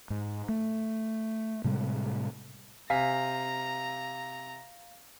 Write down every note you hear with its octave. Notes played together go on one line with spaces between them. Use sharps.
G#2
A3
A2 C3 G3 G#3
C3 F5 G#5 A#5 B6